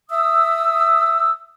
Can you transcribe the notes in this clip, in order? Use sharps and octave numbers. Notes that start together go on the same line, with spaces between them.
E5 D#6 E6